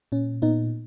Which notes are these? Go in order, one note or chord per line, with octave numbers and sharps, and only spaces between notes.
A#2 C#4
A#2 B3 D#4